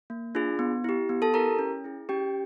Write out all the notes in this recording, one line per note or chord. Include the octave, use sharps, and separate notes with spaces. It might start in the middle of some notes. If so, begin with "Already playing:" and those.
A#3
D4 F4 G#4
B3
E4 G4
B3
A4 A5
E4 G4 A#4 A#5
C#4
E4 G#4
C#4 G4 G5